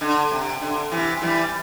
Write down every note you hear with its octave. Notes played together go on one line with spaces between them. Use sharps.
D3
C3
D3
C3 E3
E3 G3